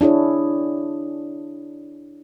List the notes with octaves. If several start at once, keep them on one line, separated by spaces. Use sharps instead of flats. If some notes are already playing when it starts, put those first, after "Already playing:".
D4 E4 G#4 C#5